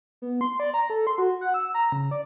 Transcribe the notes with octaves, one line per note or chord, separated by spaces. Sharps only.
B3
C6
D5
A#5
A4
C6
F#4
F#5
E6
A#5
C#3
D5